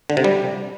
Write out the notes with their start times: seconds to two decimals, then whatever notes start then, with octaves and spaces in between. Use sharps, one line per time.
0.10 D3
0.17 C3
0.24 G3